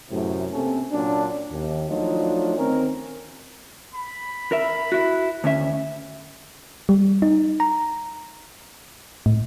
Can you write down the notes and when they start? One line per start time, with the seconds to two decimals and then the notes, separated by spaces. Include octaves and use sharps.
0.10 F#2 A2 C3
0.53 C3 A#3 C4 C#4 A4
0.92 A#2 F#3 C#4 D4
1.52 D#2
1.89 F3 F#3 A3 D4 D#4 F4
2.57 D2 D#3 C4 C#4 A#4
3.95 B5
4.52 A#4 E5
4.92 E4 F#4
5.44 D2 C#4 E5
6.89 G3
7.22 D#4
7.60 A#5
9.26 A2